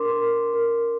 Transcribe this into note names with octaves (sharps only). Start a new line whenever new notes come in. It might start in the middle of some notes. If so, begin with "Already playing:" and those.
Already playing: D4 A#4 C6 D6
A#4
A#4